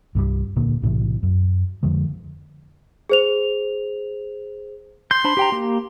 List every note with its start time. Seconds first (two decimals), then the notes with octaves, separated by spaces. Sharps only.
0.15 C2 G2 F3 G3
0.56 D#1 A#2 D3 A#3
0.82 B1 A2 C3 E3
1.23 F#2
1.83 F2 D3 F3 G#3
3.10 G#4 C5 F7
5.11 C6 G6
5.24 D4 C5 B5
5.37 G4 G5 A#5
5.52 A#3 G4